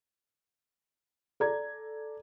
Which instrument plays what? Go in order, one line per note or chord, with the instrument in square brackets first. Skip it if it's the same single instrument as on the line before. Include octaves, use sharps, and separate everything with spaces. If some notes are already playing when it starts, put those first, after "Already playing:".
[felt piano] A4 D5 A#5 G#6